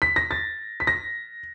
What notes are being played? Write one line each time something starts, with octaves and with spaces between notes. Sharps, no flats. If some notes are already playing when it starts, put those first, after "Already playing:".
B6
A#6
A6
B6
A#6